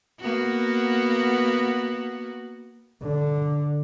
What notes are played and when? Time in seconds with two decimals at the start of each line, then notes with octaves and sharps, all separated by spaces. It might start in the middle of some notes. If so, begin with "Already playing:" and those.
0.20 A#3 B3 F#4
3.02 D3